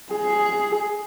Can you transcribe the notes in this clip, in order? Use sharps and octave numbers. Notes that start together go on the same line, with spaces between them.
G#4